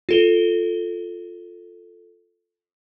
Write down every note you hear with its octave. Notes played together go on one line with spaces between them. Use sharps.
F4 A4 G7